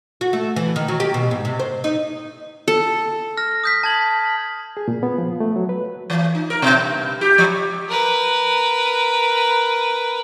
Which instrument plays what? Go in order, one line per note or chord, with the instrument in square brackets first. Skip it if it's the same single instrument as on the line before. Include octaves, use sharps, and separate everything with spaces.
[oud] F#4
A3
E3
D#3
F#3
G4
B2
G#2
C3
C5
D#4
[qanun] A4
[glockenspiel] F6 A#6
D#6 G6 B6
A5 G#6 F#7
[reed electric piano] G#4
A#2
B3
F3
A3
F#3
B4
[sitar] E3
D#4
A#4
B2
G2
G4
F3
[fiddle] A#4 B4